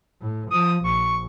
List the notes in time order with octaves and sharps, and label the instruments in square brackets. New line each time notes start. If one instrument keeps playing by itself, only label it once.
[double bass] A2
[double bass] F3 [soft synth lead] D#6
[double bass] A#1 [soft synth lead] C#6